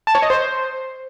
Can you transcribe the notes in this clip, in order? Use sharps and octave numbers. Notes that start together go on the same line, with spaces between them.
A5
C#5
D#5
C5